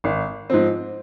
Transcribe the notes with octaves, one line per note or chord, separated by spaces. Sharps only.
G#1
G#2 F3 C4